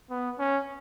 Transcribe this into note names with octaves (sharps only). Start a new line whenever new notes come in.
B3
C#4